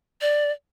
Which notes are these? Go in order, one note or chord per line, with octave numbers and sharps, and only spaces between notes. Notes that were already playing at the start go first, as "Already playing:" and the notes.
D5